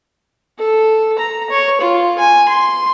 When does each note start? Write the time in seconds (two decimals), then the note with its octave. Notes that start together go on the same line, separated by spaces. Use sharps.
0.58 A4
1.18 A#5
1.50 C#5
1.81 F4
2.19 G#5
2.48 C6